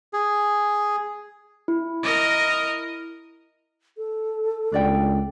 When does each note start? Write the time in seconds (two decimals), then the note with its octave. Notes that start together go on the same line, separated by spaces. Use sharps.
0.13 G#4
1.68 E4
2.03 A#4 D#5
3.98 A4
4.72 C#2 D4 D5 G5